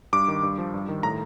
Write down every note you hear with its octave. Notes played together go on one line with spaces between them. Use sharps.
G2 D6
D#3
G2
F3
G2
D#3
A2 A#5